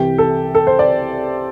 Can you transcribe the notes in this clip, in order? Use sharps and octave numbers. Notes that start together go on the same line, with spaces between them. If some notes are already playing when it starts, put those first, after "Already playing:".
Already playing: C2 C3 E3 G4
A4
A4
C5
D5